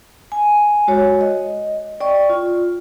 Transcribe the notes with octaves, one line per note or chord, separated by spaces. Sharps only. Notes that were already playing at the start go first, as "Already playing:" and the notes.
G#5
G#3 F#4 C#5
D#5
D5 G5 C#6
F4